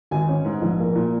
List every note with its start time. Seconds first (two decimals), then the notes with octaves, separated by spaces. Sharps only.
0.11 G#1 G#5
0.28 C#4
0.45 G#2
0.62 A#1
0.79 A#3
0.95 A#2